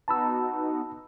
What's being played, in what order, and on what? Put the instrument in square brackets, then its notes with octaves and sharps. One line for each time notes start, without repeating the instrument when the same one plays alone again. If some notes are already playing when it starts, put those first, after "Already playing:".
[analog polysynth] B3 D#4 F#4 [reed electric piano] A5 B5 E6